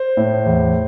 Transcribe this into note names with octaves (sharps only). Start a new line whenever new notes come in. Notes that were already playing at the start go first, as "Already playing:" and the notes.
Already playing: C5
A2
E2